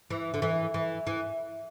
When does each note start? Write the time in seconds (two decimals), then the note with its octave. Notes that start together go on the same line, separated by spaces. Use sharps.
0.10 E3
0.34 D3
0.42 E3
0.74 E3
1.07 E3